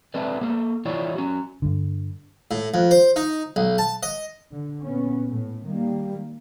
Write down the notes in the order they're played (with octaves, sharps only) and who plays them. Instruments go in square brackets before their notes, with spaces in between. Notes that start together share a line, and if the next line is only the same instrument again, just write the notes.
[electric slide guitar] A3 C4 D4 B4 D5
A#3 A4
E3 E4 F4 C#5 D5
C#4 F#4
[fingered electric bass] G2 D3
[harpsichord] A2
F2
C5
D#4
B1
A5
D#5
[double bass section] D3
A#2 B3 C#4
A2
[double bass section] D#3 A#3 [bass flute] G3